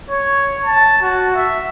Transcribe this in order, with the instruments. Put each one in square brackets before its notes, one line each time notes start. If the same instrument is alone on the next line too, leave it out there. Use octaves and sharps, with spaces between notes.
[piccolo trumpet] C#5
A5
F#4
E5